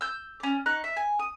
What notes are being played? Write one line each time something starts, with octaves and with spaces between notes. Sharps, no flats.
E6 G6
C#4 D5
D#4 C#6 F#6
E5
G#5
D#6